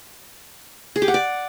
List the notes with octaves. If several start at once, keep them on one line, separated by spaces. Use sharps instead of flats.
G#4
G4
F#5
D5